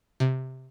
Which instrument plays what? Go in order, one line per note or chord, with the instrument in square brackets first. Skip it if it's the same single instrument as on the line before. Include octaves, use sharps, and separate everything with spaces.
[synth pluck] C3